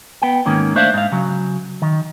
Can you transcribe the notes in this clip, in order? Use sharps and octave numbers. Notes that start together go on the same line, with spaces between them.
B3 G5
G#2 D#3 A#3 C#4
A3 D4 C5 D5 E5 F5
G#2 F5
C#3 F#3
D#3